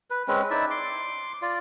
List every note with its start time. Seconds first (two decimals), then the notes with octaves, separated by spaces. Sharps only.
0.10 B4
0.28 G#3 C4 C#4 B4
0.50 D#4 E4 D5 E5
0.70 C6 D6
1.42 F4 D5